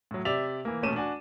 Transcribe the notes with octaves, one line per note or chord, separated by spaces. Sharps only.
A2 F#3
C3 D5 E5 F7
E3 A#3
E1 A#2 A3 C#4 D#7 E7
D4 F#4 G#5